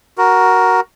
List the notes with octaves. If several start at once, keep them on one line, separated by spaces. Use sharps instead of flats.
F#4 A#4